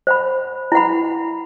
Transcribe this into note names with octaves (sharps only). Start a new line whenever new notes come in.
C5 F#5 B5
E4 B4 F#5 B5